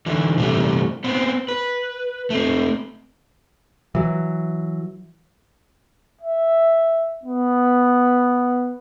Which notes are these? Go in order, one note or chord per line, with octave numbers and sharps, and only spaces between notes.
D3 E3
C3 E3 G3 A3
B3 C4
B4
A3 C4
E3 F#3
E5
B3